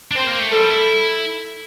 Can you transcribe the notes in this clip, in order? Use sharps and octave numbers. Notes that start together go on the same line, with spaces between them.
D4
C4 C5
A#3
A3
G3 A4
E4